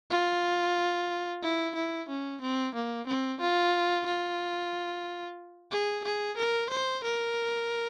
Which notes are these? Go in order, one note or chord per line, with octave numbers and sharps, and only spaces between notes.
F4
E4
E4
C#4
C4
A#3
C4
F4
F4
G#4
G#4
A#4
C5
A#4